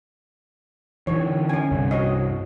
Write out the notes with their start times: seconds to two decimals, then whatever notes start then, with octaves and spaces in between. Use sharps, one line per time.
1.07 D3 E3 C#5
1.49 C#4 G#5
1.71 C2 G2 C3
1.91 F#4 C#5 D#5